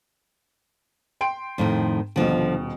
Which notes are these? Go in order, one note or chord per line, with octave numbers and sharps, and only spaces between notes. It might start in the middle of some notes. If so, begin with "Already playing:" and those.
G5 C6 D7
F2 A2 D#3
D#1 B2 D3 F3